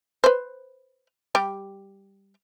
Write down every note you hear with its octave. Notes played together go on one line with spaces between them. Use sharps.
B4 C5
G3 G4 G5